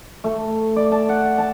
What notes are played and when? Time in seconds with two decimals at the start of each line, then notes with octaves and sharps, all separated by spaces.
0.24 A3
0.76 D5
0.92 A5
1.09 F#5
1.38 A5